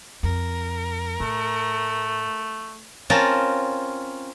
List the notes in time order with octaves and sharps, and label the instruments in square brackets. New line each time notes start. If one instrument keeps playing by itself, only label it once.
[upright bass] F2 [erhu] A#4
[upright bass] A2 [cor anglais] A3
[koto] C4 C#4 F4 A#4 A5